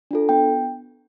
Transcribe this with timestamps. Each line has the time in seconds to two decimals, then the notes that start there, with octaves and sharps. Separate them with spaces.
0.11 D4 F4 A4
0.29 B3 G5